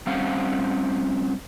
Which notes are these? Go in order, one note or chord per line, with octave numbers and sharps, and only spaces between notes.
G3 C4 C#4 C5 F5 F#5